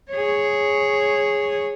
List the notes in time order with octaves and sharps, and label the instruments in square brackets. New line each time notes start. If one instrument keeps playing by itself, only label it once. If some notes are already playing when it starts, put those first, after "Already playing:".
[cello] G#4 C#5